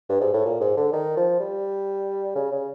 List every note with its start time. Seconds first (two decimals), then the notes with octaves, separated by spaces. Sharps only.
0.09 G2
0.21 G#2
0.33 A2
0.46 A#2
0.61 G#2
0.77 D3
0.93 D#3
1.17 F3
1.40 G3
2.35 C#3
2.51 C#3